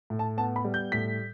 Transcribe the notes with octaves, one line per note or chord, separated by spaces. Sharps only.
A2
A5
B3 A5
B5
G3
G6
A2 B6